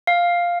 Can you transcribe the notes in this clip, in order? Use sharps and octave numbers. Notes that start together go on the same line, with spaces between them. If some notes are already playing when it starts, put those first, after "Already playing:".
F5